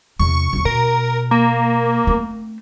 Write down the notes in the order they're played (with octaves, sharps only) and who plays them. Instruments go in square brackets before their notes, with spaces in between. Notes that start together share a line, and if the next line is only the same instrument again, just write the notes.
[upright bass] E2 C3 [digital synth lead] C#6
[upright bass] A1 D#2
[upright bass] B2 [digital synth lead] A#4
[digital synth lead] A#3
[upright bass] A3 C4